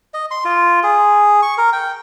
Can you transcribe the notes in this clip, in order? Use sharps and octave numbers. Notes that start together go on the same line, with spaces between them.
D#5
C6
F4
G#4
C#6
A#4
G5